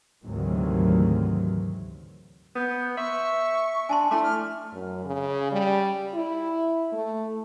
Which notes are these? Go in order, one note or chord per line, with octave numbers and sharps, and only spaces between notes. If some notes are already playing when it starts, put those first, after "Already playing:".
D2 G#2 C3 D#3 E3 F#3
B3 G6
E5 C6 C#6
D4 G#5 A5 C6
A3 E4 A5 C6 D6
F6
F#2
C#3
G3
E4
A3